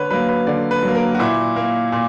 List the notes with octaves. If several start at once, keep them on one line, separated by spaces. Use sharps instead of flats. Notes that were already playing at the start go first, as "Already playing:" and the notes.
Already playing: D3 B4 C#5
F#3 A#3 B4
B4
D3 D5
B4
F#3
A#3
A#4
F#4
A#2 E4
A#3
A#2